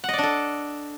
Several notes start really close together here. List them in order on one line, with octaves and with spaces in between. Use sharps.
F#5 D#5 D5 D4 A4